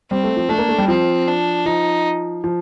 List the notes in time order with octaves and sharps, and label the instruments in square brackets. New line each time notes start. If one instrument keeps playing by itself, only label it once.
[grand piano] G3 [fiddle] C4
[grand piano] A3
F3
[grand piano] A3 [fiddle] D4
[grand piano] A#3
A3
G3
[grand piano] F3 [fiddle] C4
[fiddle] D4
[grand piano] F3 [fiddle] D#4
[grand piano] F3